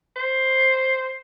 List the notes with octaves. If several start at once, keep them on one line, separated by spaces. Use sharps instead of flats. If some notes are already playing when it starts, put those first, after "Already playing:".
C5